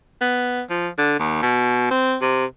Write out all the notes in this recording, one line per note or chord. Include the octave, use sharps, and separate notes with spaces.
B3
F3
D3
D#2
B2
C4
C3